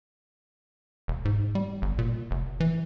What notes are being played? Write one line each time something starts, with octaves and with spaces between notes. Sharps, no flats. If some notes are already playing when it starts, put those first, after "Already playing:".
E1
G#2
G3
G1
A#2
F1
E3